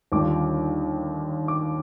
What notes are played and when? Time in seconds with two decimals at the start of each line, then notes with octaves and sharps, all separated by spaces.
0.12 D#2 D3 G3 D4 F4 D6
1.48 D6